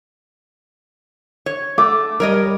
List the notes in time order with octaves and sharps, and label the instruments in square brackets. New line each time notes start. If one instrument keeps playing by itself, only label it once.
[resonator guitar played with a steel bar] C#5
[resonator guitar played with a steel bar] A3 [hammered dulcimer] D6
[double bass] G3 [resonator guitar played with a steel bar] A#4 C#5 D#5